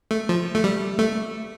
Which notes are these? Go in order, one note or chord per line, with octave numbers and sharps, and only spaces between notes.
A3
F3
A3
G3
A3